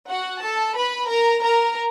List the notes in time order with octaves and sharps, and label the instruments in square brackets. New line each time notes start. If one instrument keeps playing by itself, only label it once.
[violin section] F#4 F#5
A4 A5
B4 B5
A#4 A#5
A#4 A#5